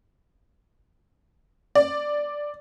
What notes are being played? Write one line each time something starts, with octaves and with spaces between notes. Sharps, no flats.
D5